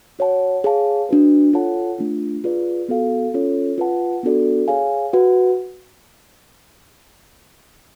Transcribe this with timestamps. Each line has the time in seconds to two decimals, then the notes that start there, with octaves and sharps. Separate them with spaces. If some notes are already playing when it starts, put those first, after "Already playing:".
0.19 F#4 C#5 F#5 A5
0.64 G#4 C#5 F5 A5
1.09 D4 F#4 B4
1.53 F4 A4 C#5 F#5 A5
1.98 A3 D4 F4
2.44 F4 G#4 B4 D5
2.89 B3 F#4 A4 F5
3.34 C#4 F4 A4 C#5
3.78 F4 B4 F#5 A5
4.23 B3 D4 F#4 A4 D5
4.68 G#4 C#5 F5 G#5
5.13 F#4 B4 F#5